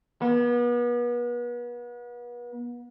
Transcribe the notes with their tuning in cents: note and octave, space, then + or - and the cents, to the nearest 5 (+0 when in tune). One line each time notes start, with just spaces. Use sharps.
B3 -35